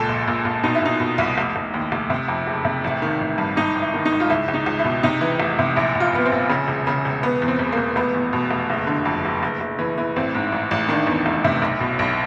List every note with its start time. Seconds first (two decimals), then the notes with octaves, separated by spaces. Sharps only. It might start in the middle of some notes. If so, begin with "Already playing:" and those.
Already playing: C#2 A#2 A4
0.09 A#1
0.28 A#2
0.45 A#2
0.63 B2 D#4
0.75 E4
0.82 B2 D#4
1.00 B2
1.18 C2
1.38 F1
1.56 F1
1.74 D#2
1.92 F1
2.10 C3
2.28 F2
2.47 F#1
2.65 C3
2.84 A1
3.02 D#3
3.21 A1
3.38 G2
3.56 G#1 D#4
3.75 G#1
3.82 E4
3.94 D#3
4.05 D#4
4.12 G#1
4.20 F4
4.30 C#2 E4
4.48 C#2
4.54 D#4
4.66 C#2
4.79 E4
4.84 B2
5.03 C3 D#4
5.21 E3
5.40 F1
5.59 C3
5.76 A#1 E4
5.95 A#1
6.00 F4
6.13 A#1 B3
6.25 C4
6.32 A#1
6.49 C#3
6.68 E1
6.87 C#3
7.05 E1
7.23 E1 B3
7.42 E2
7.48 C4
7.59 E1
7.72 A#3
7.77 E1
7.96 F1 B3
8.14 E2
8.33 B2
8.51 F1
8.70 F#1
8.87 D3
9.05 F2
9.25 F#1
9.43 F#1
9.60 F#1
9.79 E3
9.98 E3
10.16 A1 C4
10.35 G#2
10.52 A1
10.71 A1
10.89 D#3 D4
11.07 E2
11.26 F1
11.44 C3
11.62 B1
11.80 B2
11.99 B1